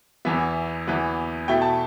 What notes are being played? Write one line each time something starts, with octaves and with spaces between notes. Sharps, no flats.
E2 E3 B3 E5
E2 E3 B3
B2 A3 E4 G5
A5